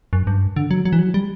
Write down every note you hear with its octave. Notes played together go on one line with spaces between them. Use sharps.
F#2
G2
D3
F#3
F#3
E3
F#3
G3